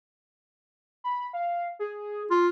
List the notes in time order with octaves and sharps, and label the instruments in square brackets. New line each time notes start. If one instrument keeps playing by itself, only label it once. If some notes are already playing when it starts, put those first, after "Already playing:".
[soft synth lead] B5
F5
G#4
[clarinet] F4